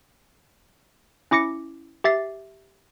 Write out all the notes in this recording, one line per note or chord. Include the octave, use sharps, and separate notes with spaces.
C#4 E4 D6 A#6 C#7
G4 E5 A6 C7